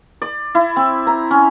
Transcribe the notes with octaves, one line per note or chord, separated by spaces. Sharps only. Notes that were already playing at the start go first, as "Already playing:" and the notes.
D5
E4
C4
A#5
C#4